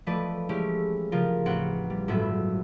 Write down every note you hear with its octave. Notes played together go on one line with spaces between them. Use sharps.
E3 F3 A3 B4 D5 D#5
G#3 A3 C#4 E4 G4
C#3 F3 F4 A#4
A1 C4 F#5 C#7
G3
G1 A2 F#3 B3 E5